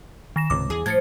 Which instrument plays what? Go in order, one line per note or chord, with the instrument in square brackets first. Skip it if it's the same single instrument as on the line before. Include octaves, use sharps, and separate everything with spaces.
[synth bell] D#3 A#6 E7
[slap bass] C#2 G#2 C3 [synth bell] D6
[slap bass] E2 [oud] G#4
[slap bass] A2 [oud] F3 [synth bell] G#6 A6 C#7